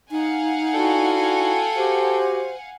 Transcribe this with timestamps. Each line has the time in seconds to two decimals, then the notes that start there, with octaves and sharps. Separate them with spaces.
0.11 D#4 F5 F#5 G#5
0.74 D4 E4 F#4 A4 G5
1.76 F#4 G4 C5